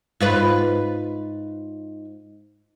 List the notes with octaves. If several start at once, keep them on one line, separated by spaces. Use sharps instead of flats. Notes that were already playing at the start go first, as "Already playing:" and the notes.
G#2 F4 B4